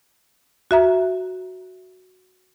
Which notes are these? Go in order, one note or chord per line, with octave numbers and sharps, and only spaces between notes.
F#4 E5 A#5